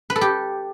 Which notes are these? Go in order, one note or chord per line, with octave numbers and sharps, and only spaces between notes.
B4
A4
G4